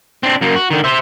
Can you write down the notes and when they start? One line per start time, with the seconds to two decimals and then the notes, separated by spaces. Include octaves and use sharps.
0.23 C4 D4
0.41 F#2 A#3
0.56 F#4
0.70 D3 D#3
0.84 C5 E5